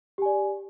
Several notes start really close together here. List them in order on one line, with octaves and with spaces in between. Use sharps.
G4 G#5 D5